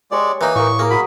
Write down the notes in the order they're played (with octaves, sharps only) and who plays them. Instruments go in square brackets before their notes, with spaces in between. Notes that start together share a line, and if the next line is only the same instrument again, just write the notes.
[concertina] G#3 D5 [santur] G4 C#5 C#6
[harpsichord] E3 D#4 [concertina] A#3 [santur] D5 D#5
[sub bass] A2 [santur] A#4 E5 F5 [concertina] C#6
[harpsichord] A#3 [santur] G#4 A#4
[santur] F#3 D#5 [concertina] B5